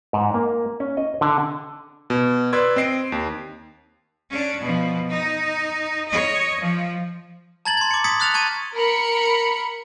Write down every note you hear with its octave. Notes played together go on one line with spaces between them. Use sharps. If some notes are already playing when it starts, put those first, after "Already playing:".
G#2
A#3
C#4
D#5
D3
B2
B4 D5 C6 E6 G#6
C4 D#5 C7 D7
D#2
C#4 D4
B2 F3
D#4
C#5 D#5
F3
A5 A#5 G#6 A6 F#7
C6 G#6
D6 C#7
C6 D#6 G#6 B6 C#7
C6 D#6 F6 F#6 A6 F7
A5 C#6 G#6 D#7
A#4 B5 C#7